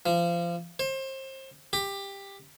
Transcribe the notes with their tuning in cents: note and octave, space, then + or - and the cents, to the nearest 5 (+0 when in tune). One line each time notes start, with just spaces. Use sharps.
F3 -30
C5 +30
G4 +15